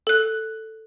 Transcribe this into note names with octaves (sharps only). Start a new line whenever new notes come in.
A4 F#6